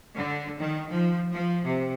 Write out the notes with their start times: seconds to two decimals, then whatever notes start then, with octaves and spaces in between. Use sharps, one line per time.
0.16 D3
0.58 D#3
0.89 F3
1.32 F3
1.66 C3